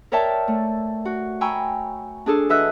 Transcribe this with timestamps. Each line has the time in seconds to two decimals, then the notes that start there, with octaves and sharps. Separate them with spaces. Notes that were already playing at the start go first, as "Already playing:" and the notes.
0.12 A#4 C#5 D5 E5 G5 A5
0.48 A3
1.05 F#4
1.41 G5 G#5 A#5 B5 C#6 E6
2.26 D4 G#4 A4
2.49 E3 F#4 D#5 E5 E6 F#6